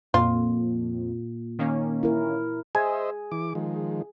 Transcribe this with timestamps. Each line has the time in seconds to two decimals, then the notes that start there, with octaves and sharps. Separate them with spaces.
0.14 F2 A#2 F4
1.59 D#3 A#3 C#4
2.03 E4 A#4
2.75 G#4 C5 D#5 E5 G#5
3.32 E3 D6
3.55 D#3 F3 G#3